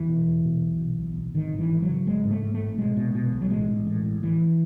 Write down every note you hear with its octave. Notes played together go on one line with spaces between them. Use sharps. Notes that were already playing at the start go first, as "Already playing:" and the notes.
Already playing: E2 E3
B2
E1
B2
B1
B2
B1
B1
G#1 D#3
G#1
E3
G#1
F#3
C#3
G#1 G#3
G#2
A3
G#2
A3
G#1
B2 G#3
B2
B2
B1
F#3
A1 G#3
A1
A2
A1
A1 E3